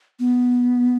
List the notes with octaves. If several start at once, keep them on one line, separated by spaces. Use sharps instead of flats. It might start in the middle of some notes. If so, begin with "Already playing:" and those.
B3